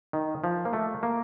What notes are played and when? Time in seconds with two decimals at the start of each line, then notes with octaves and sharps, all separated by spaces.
0.13 D#3
0.44 F3
0.65 A#3
0.73 A3
1.03 A#3